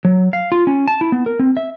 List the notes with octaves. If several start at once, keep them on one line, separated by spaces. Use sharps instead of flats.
F#3
F5
F4
C#4
A5
E4
B3
A#4
C4
E5